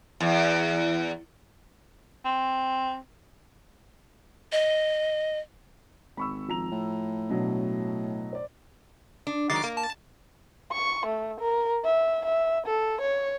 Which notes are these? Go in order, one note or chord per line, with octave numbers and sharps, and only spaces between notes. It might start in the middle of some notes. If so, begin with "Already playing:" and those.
E2
C4
D#5
G#1 B5 C#6 E6
F3 A#5 F7
A2
B2 F#3 D4
C5 D5
D4
D#3 F#3 G#3 D6 A6 C7
A#3
A5
C#6
A3
A#4
E5
E5
A4
C#5